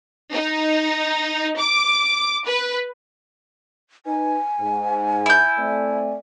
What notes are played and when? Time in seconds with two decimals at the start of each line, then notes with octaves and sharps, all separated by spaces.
0.32 D#4
1.58 D6
2.45 B4
4.06 D#4 B4 G#5
4.60 G#2
5.26 E4 G6
5.57 A3 C4 D5